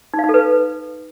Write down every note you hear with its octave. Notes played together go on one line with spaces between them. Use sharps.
D#4
F5
D#4
A4
B4